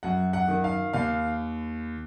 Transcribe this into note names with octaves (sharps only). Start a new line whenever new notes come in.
F#2 F#5
F#5
D#3
F5
D#2 F5